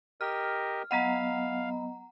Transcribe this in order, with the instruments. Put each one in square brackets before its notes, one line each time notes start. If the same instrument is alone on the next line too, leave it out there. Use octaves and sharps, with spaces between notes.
[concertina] G4 A#4 D#5 [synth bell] F6
[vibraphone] F#3 B3 D#5 [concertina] F5 [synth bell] F#5 A#5